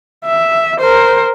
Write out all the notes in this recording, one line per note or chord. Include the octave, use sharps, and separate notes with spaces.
E5
A#4 C5